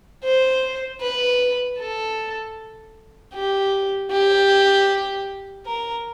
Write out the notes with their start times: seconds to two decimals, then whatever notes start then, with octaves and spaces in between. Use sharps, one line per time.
0.24 C5
1.01 B4
1.79 A4
3.34 G4
4.11 G4
5.66 A#4